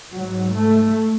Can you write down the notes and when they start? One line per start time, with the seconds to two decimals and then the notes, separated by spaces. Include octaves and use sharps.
0.14 G#2 F#3
0.55 A3